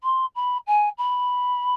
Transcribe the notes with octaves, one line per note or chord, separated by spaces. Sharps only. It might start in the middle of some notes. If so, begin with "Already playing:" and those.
C6
B5
G#5
B5